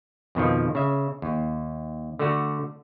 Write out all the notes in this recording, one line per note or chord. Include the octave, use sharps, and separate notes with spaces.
F2 B2 D#3 F3
C#3 E5
D#2
D3 A3 F#4